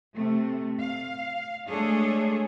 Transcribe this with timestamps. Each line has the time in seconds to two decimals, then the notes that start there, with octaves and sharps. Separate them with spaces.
0.16 C3 A3
0.77 F5
1.68 G#3 A3 D4 G#4 A4 C#5